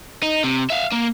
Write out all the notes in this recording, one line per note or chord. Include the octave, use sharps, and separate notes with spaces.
D#4
C3
E5 F5
A#3